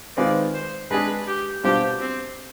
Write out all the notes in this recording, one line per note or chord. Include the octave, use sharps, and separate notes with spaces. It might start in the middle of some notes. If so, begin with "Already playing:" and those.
D#3 G#3 C4 F4 B4 D5
C5
G#3 D4 G#4 B4
G4
B2 G3 D4 F4 G4 C5
C4